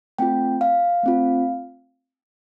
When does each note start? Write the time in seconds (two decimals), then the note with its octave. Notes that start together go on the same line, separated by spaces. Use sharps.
0.19 A3 C4 F4 G5
0.61 F5
1.03 A3 C4 F4